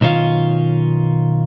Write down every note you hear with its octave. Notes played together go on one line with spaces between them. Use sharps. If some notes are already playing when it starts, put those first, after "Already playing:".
B1 D#3 C#4 F4